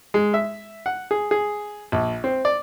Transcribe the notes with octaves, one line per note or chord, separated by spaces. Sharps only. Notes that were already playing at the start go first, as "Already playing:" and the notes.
G#3
E5
F#5
G#4
G#4
A#1
C4
D5